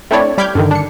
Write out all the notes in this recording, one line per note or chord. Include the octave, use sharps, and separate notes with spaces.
A3 C4 D4 E4 C#5 D5
G3 B5 D6 F6 G6 G#6
G2 D3 D#3
D4 C#7